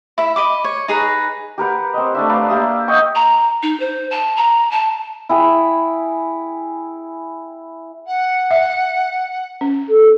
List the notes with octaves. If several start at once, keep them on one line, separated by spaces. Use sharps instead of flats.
E4 E5
D#5 B5 D6
C#5
D#4 G#4 B4 A#5
G4 A#4 B4 F#5
C4 D#5
A3 D4 E5
A#4 B4 D5 F5
A#3 G4 E5 D#6
D#5 F#5 G5 C#6
A#5
D#4
C5
A5
A#5
A5
E4 G#4 G5
F#5
E5
C#4
A4